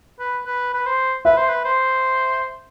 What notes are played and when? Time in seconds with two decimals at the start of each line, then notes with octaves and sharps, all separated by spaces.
0.19 B4
0.46 B4
0.74 B4
0.86 C5
1.25 B4 E5
1.37 C5
1.48 B4
1.65 C5